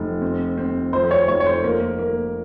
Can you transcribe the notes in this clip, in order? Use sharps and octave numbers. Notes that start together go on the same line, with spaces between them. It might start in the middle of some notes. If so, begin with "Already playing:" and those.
Already playing: F1
C4
C4
F2 C5
C#5
F1 C#5
C#5
C5
A#3 A#4
A#3